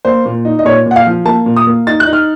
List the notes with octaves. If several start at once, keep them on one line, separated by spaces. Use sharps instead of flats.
A#3 C5
A#2
D#4
D#5
A#2 C#5
A#2
F#5
F5
F3
A#3 A5
A#2
D#6
A#3
D#4 A6
F#6
D#4
F6